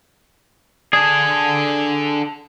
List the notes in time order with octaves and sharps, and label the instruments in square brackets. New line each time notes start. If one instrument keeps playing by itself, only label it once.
[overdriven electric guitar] D4 A4 [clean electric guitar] G#4